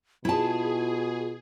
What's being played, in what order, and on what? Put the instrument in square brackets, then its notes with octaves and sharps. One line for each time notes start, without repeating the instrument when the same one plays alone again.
[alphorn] B2 [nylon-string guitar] E4 A5 [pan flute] F4 [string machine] G#4